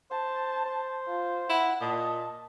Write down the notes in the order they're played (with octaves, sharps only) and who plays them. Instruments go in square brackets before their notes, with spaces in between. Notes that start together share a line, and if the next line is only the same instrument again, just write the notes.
[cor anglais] C5 [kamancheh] A5
[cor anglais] C5
[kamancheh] F4
[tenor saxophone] E4 [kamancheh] F#5
[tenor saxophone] A#2 [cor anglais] D#5 [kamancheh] A5